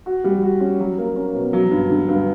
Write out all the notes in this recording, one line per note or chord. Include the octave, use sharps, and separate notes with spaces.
F#4
G3
F#4
C#4
F#3
A#3
C#4
B2
F#3
G2
D3
G2